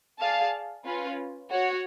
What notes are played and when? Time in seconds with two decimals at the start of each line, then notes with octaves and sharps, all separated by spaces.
0.19 G#4 D5 F5 A5
0.85 C#4 F4 B4
1.50 F#4 C#5 F#5